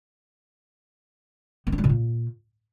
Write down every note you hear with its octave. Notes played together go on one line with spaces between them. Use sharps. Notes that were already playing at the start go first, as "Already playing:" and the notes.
B3
D4
G#3
B2
A#2